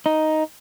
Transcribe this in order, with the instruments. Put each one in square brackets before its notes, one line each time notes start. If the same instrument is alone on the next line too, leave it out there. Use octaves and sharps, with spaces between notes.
[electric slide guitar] D#4